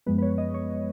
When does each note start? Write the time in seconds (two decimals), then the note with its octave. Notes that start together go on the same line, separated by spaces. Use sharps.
0.06 F#2 F3 G#3 B3 B4
0.18 B4
0.22 C#5
0.38 D#5
0.54 C#5